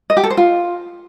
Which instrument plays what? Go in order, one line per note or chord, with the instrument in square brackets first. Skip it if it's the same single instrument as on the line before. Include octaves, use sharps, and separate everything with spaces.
[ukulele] D#5
G4
A4
C5
F4